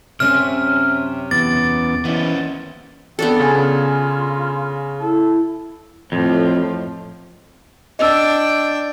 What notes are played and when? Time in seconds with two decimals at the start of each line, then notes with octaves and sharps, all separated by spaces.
0.20 F#2 C3 C#4 E5 F6
1.31 E2 B3 D6 A6
2.05 D#2 E3 B3 C#4
3.19 B3 C4 D4 A4
3.39 C#3 F4 G#5
5.00 E4 A4
6.12 F2 A2 F3
7.99 D4 D#5 G5 E6